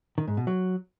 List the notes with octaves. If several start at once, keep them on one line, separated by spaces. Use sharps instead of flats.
D#3
G#2
B2
F#3